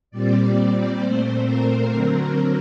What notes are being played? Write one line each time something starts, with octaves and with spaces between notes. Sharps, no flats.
A#2 G3 C4 D5
D5
A#2 A3 C4 C5
A#4
D3 F#3 C4 A#4